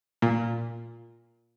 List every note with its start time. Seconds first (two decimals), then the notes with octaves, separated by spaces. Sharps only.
0.22 A#2